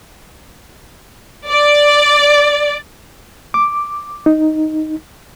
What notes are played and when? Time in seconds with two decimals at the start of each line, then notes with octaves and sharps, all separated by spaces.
1.48 D5
3.54 D6
4.26 D#4